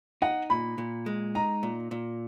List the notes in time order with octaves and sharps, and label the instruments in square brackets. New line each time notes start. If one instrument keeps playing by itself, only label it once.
[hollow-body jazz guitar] D#4 [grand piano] F#5
[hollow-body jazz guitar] A#2 [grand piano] B5
[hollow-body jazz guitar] A#2
G#3
[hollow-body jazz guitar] D#4 [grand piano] A#5
[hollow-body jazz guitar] A#2
A#2